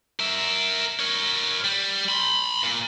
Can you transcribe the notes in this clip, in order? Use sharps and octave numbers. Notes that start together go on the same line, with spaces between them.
A#4 E5
A#4 C#5
G3
B5 C6
A#2